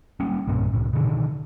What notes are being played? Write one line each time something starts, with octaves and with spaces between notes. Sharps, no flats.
G3 A#3 C#4
B1 G2 A#2 C#4
C2 A2
B2 D3 D#3